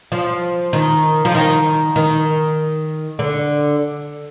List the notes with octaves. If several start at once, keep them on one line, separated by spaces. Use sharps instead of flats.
F3
D#3
F3
D#3
D#3
D3